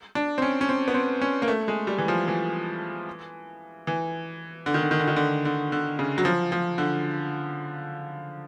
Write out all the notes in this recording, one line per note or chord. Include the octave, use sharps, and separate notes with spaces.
D4
C4
C#4
C#4
C4
B3
C4
C#4
A#3
A3
G#3
G3
E3
F3
E3
E3
D3
D#3
D3
D#3
D3
D#3
D3
D3
D3
C#3
F#3
F3
F3
D3